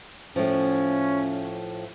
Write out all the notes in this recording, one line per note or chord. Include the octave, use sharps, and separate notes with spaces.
A2 F3 C#4